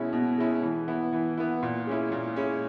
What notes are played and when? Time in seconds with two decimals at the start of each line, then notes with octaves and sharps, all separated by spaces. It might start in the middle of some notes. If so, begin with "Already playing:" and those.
Already playing: B2 G#3 C#4 E4
0.13 B2
0.38 G#3 C#4 E4
0.63 E3
0.88 B3 E4
1.13 E3
1.37 B3 E4
1.63 A#2
1.87 G#3 C#4 E4
2.12 A#2
2.36 G#3 C#4 E4